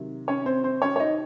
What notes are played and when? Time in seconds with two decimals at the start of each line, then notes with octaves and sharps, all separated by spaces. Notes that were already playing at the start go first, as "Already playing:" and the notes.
Already playing: C3 D#3 F#3
0.28 C#4 C#5
0.46 C4 C5
0.64 C4 C5
0.82 C#4 C#5
0.96 C#5
1.00 D#4 D#5